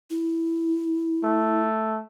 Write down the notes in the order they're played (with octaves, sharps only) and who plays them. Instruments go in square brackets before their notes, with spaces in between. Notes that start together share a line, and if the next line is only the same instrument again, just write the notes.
[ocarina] E4
[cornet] A3